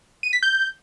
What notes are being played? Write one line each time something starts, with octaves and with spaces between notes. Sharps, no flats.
D#7
B6
G6